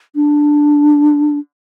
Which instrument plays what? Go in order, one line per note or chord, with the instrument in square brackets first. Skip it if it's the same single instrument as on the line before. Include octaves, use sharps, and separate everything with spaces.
[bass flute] D4